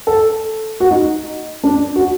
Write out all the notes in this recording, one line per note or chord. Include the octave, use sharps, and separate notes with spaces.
A4
F#4
D#4
D4
F#4